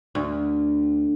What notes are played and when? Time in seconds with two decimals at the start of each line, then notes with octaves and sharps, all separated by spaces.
0.15 D2